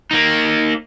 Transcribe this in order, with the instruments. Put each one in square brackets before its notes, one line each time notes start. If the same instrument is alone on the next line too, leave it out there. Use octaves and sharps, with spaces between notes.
[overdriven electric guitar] A#3 D#4